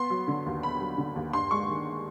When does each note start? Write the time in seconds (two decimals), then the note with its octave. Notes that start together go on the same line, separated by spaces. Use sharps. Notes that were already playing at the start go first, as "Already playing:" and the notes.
Already playing: B3 C6
0.10 F#3
0.28 D3
0.46 D#2
0.63 B3 B5
0.80 F#3
0.98 D3
1.16 D#2
1.33 G2 C6
1.51 G#3 C#6
1.69 D#3